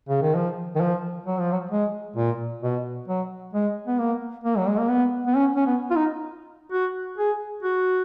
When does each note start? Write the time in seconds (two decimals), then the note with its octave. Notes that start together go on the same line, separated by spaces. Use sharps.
0.09 C#3
0.22 D#3
0.35 F3
0.76 D#3
0.81 F3
1.27 F#3
1.39 F3
1.52 F#3
1.71 G#3
2.17 A#2
2.62 B2
3.08 F#3
3.53 G#3
3.87 B3
3.99 A#3
4.44 A#3
4.58 F#3
4.68 G#3
4.79 A#3
4.90 B3
5.27 B3
5.36 C#4
5.56 C#4
5.66 B3
5.91 F4
5.96 D#4
6.72 F#4
7.18 G#4
7.63 F#4